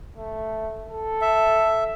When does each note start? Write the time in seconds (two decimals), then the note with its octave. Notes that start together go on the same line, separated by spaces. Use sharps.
0.17 A3
0.88 A4
1.22 E5